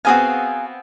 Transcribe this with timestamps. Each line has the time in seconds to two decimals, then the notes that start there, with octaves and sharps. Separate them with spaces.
0.05 B3 C4 F#4 G#4 F5 G#5